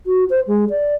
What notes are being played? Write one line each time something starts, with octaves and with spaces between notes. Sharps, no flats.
F#4
C5
G#3
D5